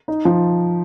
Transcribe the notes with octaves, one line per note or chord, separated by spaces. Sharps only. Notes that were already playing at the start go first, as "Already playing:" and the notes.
D#4
F3